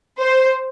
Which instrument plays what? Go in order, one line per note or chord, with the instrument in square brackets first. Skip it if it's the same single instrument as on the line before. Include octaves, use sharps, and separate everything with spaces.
[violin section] C5